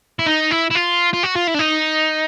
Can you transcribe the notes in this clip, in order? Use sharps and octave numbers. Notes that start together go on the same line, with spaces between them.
E4
D#4
E4
E4
F4
F4
F#4
F4
E4
D4
D#4